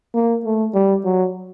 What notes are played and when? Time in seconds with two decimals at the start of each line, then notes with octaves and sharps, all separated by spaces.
0.15 A#3
0.45 A3
0.74 G3
1.05 F#3